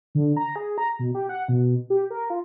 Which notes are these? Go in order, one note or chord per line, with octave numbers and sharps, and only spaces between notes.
D3
A#5
G#4
A#5
B2
G4
F#5
B2
G4
A#4
F4